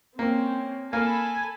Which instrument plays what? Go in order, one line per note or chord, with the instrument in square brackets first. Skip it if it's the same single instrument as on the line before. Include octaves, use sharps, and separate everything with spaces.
[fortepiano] A#3 [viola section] C4 C#4
[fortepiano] A#3 F5 [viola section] A4 A5 B5 [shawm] G#5